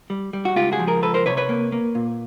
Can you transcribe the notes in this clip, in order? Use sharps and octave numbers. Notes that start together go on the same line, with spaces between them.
G3
G3
F#4
C#2 F4 G4
F#4 G#4
F3
G#4 A#4
C#2 A4 B4
A#4 C5
C3 B4 C#5
B4 C#5
A#3
A#3
A#2